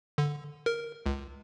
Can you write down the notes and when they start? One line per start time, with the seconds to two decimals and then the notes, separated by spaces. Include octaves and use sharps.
0.18 D3
0.66 A#4
1.06 C#2